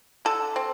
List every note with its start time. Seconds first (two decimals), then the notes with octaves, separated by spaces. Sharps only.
0.25 D3 A4
0.56 C4